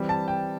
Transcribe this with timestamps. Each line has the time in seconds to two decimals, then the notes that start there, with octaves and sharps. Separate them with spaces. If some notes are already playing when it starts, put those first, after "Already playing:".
Already playing: E3 G3 C4
0.09 A5
0.28 G5